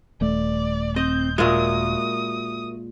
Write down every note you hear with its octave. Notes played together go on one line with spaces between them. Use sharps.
D#1 A3 D5
C4 D#5 G6
A#2 G#3 F#4 A#4 E5 D#6